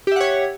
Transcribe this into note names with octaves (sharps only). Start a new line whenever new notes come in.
G4 C#5 E5 F#5